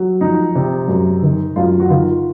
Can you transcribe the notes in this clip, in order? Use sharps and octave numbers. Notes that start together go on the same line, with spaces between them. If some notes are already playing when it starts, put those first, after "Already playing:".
Already playing: F#3
F2 D#4
C3
F#2
D#3
F#2 F4
F#4
D#3 F4